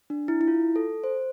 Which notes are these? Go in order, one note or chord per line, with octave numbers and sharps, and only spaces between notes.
D4
E4
E4
F4
A4
C5